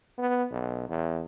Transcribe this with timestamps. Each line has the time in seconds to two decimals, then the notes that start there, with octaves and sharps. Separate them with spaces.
0.18 B3
0.51 B1
0.89 E2